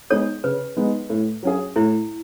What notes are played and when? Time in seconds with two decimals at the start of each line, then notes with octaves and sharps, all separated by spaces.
0.10 G#3 B3 D#4 A4 C#5
0.44 C#3 B4
0.76 G#3 B3 D#4
1.10 A2
1.43 F#3 C#4 G#4
1.76 A2 E4